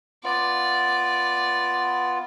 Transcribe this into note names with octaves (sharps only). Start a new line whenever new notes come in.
B3 F4 D5